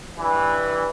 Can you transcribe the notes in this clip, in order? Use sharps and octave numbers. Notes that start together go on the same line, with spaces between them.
G2 E3